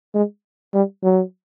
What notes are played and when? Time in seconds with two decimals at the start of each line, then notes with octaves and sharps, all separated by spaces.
0.14 G#3
0.74 G3
1.03 F#3